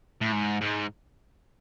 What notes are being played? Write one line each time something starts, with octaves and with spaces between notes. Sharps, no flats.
A2
G#2
G#2